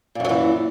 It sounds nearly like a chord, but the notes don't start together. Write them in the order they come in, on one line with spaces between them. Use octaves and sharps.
A#2 F#2 F#3 E3